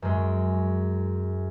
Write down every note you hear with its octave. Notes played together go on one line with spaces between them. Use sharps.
F#2 G#3